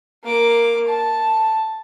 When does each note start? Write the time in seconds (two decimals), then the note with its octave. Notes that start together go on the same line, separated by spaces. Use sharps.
0.24 A#3 D6
0.87 A5